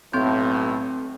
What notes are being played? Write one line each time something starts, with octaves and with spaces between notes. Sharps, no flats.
B1 A2 C4 C6 G6